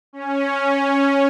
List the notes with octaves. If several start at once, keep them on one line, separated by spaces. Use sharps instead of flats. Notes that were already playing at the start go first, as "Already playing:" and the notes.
C#4